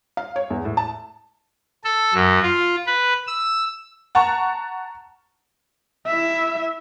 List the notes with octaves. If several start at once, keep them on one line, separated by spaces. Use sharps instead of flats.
F5
C#5
E2
A2
A5
A4
F#2
F4
B4
E6
F#5 A5 A#5 C#6
E4 E5